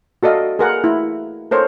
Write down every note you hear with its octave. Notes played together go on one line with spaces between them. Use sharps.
F#4 A4 D5 D#5 F5
G#4 A#4 F#5
E4
A4 A#4 C5 C#5